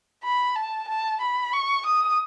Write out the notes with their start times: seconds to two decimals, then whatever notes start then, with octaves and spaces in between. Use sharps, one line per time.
0.23 B5
0.55 A5
0.88 A5
1.21 B5
1.53 C#6
1.86 D#6